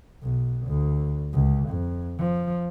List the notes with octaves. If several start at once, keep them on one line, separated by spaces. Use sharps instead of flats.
B1
D2
C#2
F2
F3